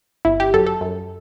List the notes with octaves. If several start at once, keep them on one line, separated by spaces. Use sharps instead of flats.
G1 E4
G4
F#2 A4
A4
F#2